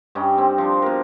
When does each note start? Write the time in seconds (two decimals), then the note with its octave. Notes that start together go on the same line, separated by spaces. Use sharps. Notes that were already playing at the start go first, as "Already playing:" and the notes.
0.15 G2 C#4 D#4 G5
0.38 C4
0.58 F3 D4
0.82 B2 A#4